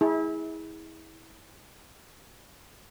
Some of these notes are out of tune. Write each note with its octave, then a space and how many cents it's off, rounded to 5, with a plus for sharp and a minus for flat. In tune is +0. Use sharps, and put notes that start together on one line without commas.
E4 -30 G#4 -10